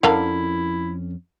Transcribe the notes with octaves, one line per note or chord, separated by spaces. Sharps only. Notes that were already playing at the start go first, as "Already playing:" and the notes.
F2 D3 C#4 E4 A#4 F5